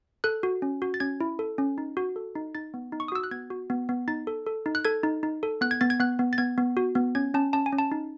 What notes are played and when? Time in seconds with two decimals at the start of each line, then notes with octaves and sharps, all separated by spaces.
0.24 A4 F#6
0.43 F#4
0.62 C#4
0.82 F#4
0.94 A6
1.00 C#4 G#6
1.20 E4
1.39 A4
1.58 C#4
1.78 D#4
1.97 F#4
2.16 A4
2.35 D#4
2.55 D#4 A6
2.74 B3
2.92 D#4
3.00 C#6
3.08 D#6
3.12 F#4 E6
3.24 F#6
3.31 B3 G#6
3.50 F#4
3.70 B3
3.89 B3
4.08 D#4 A6
4.27 A4
4.46 A4
4.66 D#4
4.75 F#6
4.85 A4 G#6
5.04 D#4
5.23 D#4
5.43 A4
5.61 B3 F#6
5.71 G#6
5.81 B3 A6
5.90 G#6
6.00 B3 F#6
6.19 B3
6.33 A6
6.38 B3 G#6
6.58 B3
6.77 F#4
6.95 B3
7.15 C#4 G#6
7.34 C#4 A5
7.53 C#4 A5
7.66 G#5
7.72 C#4
7.79 A5
7.92 D#4